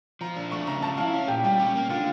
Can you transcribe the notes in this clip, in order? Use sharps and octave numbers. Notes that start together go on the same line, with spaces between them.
F3 A#5
D4
A3 C#6
C#3 A#5
F3 A5
E4 F5
C#4
A#2 G4
G3 G4
C#4
A#3
D3 F4